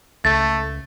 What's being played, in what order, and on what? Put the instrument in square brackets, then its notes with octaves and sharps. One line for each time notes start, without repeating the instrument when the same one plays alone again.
[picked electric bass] C#2 [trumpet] A3 [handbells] A6